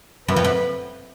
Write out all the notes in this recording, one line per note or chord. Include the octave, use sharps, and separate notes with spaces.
F#2 B4
F2
F#2